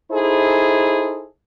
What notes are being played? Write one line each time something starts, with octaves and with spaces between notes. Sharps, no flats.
D#4 E4 G#4 A4 C5